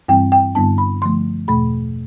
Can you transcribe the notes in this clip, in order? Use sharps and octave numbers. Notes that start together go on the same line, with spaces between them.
G2 E3 G3 C4 G5
G5
G2 D3 G3 B3 D4 A5
B5
D3 F3 A3 C6
E2 B2 A3 B5